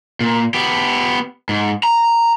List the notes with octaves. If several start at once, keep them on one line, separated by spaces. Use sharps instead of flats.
A#2
B3 G4
G#2
A#5